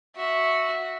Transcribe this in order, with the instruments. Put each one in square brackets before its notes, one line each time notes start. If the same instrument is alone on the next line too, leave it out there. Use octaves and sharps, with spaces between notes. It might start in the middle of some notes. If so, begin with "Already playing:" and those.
[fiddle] F#4 E5